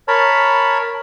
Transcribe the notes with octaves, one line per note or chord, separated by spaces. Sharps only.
A#4 C#5 A5 B5